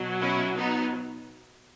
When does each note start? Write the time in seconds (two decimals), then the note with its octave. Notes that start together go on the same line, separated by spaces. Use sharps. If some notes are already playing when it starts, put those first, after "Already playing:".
Already playing: B2 F#3
0.21 C#4 E4
0.57 B3 D#4